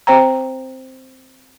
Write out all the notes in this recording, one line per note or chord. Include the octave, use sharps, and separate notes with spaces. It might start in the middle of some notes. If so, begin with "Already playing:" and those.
C4 C5 G5 A#5